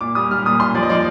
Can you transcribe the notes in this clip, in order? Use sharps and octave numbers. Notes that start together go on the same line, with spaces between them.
A#2 D6
G3 D#6
G3 F6
A#2 D#6
A#2 C6
F3 D5
D#5
F3 D5